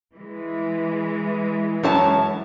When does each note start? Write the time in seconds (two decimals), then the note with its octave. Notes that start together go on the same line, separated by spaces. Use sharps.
0.16 E3 G#3
1.83 F#2 C#5 A5